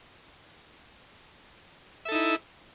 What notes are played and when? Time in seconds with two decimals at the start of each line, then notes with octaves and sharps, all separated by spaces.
2.05 E5
2.09 A4
2.12 D#4
2.15 E4